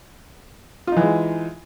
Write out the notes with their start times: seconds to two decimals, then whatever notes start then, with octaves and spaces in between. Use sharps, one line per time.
0.87 F4
0.92 D#4
0.97 E3
1.01 G#3